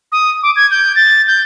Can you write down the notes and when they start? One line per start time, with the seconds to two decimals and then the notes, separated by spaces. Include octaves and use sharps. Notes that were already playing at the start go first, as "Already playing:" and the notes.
0.12 D#6
0.43 D6
0.56 G#6
0.71 G6
0.96 A6
1.27 G6